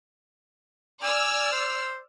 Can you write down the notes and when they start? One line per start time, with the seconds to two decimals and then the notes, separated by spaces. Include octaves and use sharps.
1.03 D5 G#5 E6 F6
1.52 C5